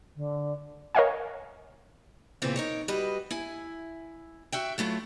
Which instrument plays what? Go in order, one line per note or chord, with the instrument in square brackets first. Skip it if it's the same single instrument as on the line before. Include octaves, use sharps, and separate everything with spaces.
[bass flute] D3
[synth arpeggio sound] A#4 C#5 D#5 F5 F#5 G#5
[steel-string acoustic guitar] A#2 C#3 E3 B3 C4 F4
D#4 A#4 C#5
G3 F#4 B4 D#5
E4 G#5
F#4 E5 G5
F#3 A3 E4 F4